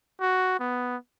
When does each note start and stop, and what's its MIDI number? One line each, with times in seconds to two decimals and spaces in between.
0.21 0.56 66
0.60 0.97 59